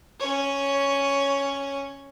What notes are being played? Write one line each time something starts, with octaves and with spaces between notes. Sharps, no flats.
C#4 C#5